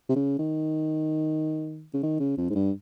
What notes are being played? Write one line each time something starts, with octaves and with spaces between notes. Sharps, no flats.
C3
C#3
D#3
C#3
D#3
C#3
F2
G#2
G2